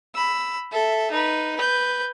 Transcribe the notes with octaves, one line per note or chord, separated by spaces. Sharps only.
B5 E6
A4 E5
D#4 B4
B4 G6